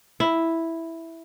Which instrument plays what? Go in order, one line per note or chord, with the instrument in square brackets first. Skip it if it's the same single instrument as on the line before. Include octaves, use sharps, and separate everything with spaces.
[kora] E4